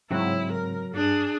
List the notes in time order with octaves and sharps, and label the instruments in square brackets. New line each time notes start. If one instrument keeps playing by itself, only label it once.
[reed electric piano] G#2 C#3 C4 [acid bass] F#3 [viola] E4
[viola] A#4
[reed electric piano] G2 [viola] D4 G#4